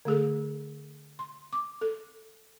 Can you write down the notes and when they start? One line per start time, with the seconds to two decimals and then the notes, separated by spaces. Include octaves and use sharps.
0.05 D3 A3 G#4 A4
1.19 C6
1.53 D6
1.81 A4